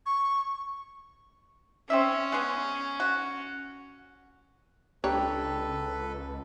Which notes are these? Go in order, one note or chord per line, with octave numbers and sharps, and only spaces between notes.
C#6
C4 C#4 D5 E5
G#3 B3 G#4
F#4
C#2 D4 G4 A4 B4 C#5 G5 A#5